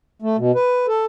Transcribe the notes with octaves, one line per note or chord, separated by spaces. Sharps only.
A3
B2
B4
A4